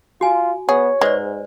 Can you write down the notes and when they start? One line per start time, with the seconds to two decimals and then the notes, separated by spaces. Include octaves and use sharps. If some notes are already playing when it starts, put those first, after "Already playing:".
0.21 F4 F#4 G#5
0.69 B3 G#4 C#5
1.01 G#2 G#3 B4 C5 D5